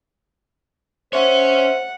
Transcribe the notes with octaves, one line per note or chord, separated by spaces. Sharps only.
C#4 C5 C#5 E5 F#5